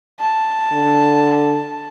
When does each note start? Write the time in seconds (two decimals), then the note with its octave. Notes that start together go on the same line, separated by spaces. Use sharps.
0.20 A5
0.72 D3